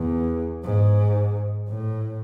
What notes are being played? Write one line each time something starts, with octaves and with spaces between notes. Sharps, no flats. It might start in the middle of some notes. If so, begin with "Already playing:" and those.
Already playing: E2
G#2
A2